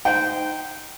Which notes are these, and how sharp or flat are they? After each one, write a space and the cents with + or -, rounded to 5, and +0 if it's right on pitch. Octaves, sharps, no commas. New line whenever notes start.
D#4 +0 C5 -25 G5 -10